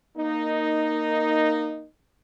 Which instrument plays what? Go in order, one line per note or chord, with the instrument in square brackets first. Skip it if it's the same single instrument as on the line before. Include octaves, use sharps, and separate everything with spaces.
[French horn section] A#3 D#4